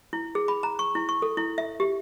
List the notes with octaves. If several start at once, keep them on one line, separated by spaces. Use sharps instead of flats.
E4
G#4
B5
A#5
C#6
E4
C#6
A4
E4
E5
G4